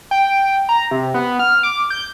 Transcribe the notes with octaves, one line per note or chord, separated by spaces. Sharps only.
G5
A#5
C3
B3
F6
D6
G6